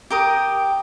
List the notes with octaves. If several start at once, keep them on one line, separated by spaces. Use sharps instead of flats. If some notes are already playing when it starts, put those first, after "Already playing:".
G4 A#4 D#6